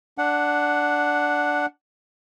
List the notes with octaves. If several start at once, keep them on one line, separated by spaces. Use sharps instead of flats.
D4 F#5